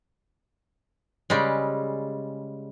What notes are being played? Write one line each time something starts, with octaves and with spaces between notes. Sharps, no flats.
C#3 G3 G#3